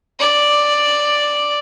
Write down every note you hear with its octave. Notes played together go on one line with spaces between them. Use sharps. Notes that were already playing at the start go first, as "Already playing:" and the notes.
D5